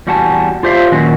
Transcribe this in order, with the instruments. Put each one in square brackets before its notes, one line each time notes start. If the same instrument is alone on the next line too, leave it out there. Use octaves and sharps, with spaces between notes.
[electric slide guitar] E2 G3 F#4 F#5 G#5 A5
F4 G4 C5 D5 E5 F5
A#2 D#3 F#3 C#4 F#4